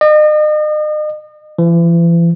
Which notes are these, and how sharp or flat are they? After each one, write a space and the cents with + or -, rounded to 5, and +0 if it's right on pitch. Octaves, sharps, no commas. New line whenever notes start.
D#5 -40
E3 +40